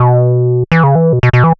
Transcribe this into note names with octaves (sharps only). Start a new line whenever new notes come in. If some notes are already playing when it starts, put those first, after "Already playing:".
Already playing: B2
E3
C#3
E3
B2
B2
B2
E3